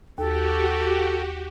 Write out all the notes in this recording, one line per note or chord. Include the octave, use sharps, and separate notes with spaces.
D#2 F#4 G4 A4